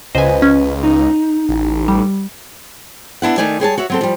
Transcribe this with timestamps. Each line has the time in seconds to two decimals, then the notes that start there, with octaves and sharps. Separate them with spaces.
0.15 C#2 B4 C5 D#5 G#5
0.42 C#4
0.84 D#4
1.49 A1
1.88 G3
3.22 B3 D4 E4 F#5
3.38 D#3 A3 D#4 D5 G#5
3.60 G3 G#4 C#5 A5
3.78 F#4 C#5 E5
3.90 F#3 C4 A4
4.01 F3 G3